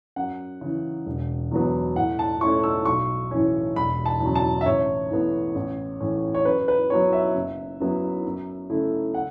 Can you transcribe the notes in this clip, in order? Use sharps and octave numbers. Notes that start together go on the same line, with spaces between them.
F#2 F#5
C#3 E3
E1
E2 B2 F#3 B3
A2 F#5
A5
A3 C#4 E4 C#6
E6
B1 C#6
A2 E3 C#4
E1 B5
A5
E2 C#3 F#3
A5
E5
A1 C#5
A2 E3 B3
A1
A2 E3 C#4
C#5
F#2 B4
B4
F#3 B3 E4 C#5
E5
F#1
F#2 F#3 B3 E4
F#2
C#3 A3 E4
F#5